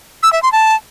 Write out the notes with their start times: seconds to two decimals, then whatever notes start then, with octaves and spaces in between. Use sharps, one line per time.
0.23 E6
0.33 E5
0.42 C6
0.52 A5